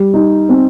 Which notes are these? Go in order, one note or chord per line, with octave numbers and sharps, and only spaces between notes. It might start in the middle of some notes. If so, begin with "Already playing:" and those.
Already playing: G3
D#4
C4